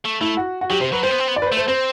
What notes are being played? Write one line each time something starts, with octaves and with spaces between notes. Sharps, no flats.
A3
A3 E4
F#4
F#4
F#3 G4
C3 C5
F#3 B4
G3 C5
B3
C4
B3
D5
B4
C5
A3
C5
C4 C5